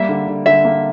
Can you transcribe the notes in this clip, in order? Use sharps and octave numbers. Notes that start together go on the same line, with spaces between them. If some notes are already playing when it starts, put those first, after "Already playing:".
Already playing: G3 A#3 E5
D3
D3
D3 E5
A#3